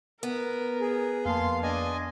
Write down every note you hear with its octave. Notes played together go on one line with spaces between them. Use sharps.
B3 A#4
G#4
F2 A#3 F5 A5 C6
D4 D#5 G#5